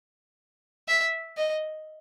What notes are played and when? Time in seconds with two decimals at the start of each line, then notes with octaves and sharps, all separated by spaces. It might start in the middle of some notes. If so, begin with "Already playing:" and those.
0.88 E5
1.37 D#5